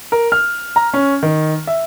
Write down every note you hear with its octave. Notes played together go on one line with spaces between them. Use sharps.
A#4
F6
A#5
C#4
D#3
E5